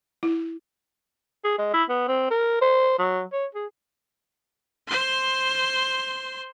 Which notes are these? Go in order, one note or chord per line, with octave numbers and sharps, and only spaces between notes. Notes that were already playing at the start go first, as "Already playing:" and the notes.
E4
G#4
G#3
E4
B3
C4
A#4
C5
F#3
C#5
G#4
C5 C6